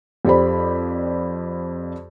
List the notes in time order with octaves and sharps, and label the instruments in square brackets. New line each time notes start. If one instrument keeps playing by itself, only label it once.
[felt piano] F2 G4 C5 D5 B5